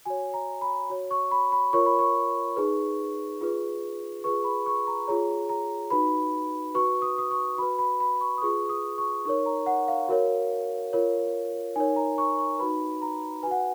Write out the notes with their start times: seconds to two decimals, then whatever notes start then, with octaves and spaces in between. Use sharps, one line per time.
0.05 F#4 C#5 G#5
0.34 A#5
0.61 B5
0.90 F#4 C#5
1.11 C#6
1.31 B5
1.52 B5
1.73 F4 A#4 C#5 C#6
1.86 B5
1.99 C#6
2.56 D#4 G#4 B4
3.41 F4 G#4 B4
4.24 F4 G#4 B4 C#6
4.44 B5
4.66 C#6
4.87 A#5
5.08 F4 G#4 C#5 A#5
5.49 A#5
5.90 D#4 F#4 B4 B5
6.75 F#4 B4 C#6
7.02 D#6
7.18 D#6
7.31 C#6
7.58 F#4 B4 B5
7.79 B5
8.00 B5
8.21 C#6
8.38 D#6
8.42 F4 G#4 B4 C#6
8.69 D#6
8.98 C#6
9.25 D#4 A#4 C#5 C#6
9.46 A#5
9.66 F#5
9.88 F5
10.09 F#4 A#4 C#5
10.93 F4 A#4 C#5
11.76 D#4 A#4 C#5 G#5
11.96 A#5
12.18 C#6
12.39 C#6
12.59 D#4 F#4 B4 B5
13.02 A#5
13.43 B4 G#5
13.47 F#4 F#5